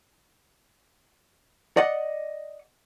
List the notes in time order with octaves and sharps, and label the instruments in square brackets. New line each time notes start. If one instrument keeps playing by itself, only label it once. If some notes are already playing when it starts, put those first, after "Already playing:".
[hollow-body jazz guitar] D5 D#5 F#5